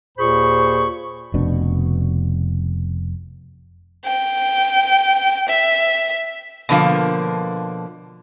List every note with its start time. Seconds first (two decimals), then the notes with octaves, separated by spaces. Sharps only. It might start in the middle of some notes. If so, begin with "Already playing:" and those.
0.18 D#2 A#2 G#4 C5 B5 C#6
1.34 F1 B2 D4
4.05 G5
5.49 E5
6.69 B2 D3 F3 A#3